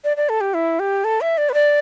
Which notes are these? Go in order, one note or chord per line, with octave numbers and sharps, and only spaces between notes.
D5
D5
A4
G4
E4
G4
A4
E5
D5
B4
D5